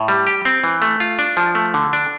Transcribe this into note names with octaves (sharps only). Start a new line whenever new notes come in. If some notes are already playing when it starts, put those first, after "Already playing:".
Already playing: A2
G3
G4
C4
E3
A3
F4
D4
F3
A3
D3
D4